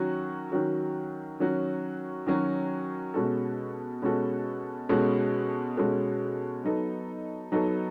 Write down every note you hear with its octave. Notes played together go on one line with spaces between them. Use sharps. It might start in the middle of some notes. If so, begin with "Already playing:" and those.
Already playing: D#3 F#3 C#4 F#4
D#3 F#3 C#4 F#4
D#3 F#3 C#4 F#4
D#3 F#3 C#4 F#4
B2 G#3 C#4 F#4 A4
B2 G#3 C#4 F#4 A4
B2 G#3 C#4 F#4 A4
B2 G#3 C#4 F#4 A4
F#3 B3 D#4 A4
F#3 B3 D#4 A4